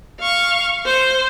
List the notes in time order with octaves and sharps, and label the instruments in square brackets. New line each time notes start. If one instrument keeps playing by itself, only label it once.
[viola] F5 C#6
C5